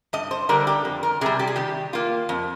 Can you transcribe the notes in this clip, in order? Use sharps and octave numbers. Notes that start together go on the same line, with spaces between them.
G2 D#5
C5
D3 G3 A#4
G4
F2
A#4
C3 G3 G#4
G4
G#4
D#3 G4
A#3 F4
F2